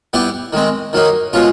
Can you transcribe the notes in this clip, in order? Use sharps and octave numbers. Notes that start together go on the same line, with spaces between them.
G3 B3 E4 G4
D#3 G#3 C4
D#3 F#3 A#3 D#4
B2 G#3 C#4 F4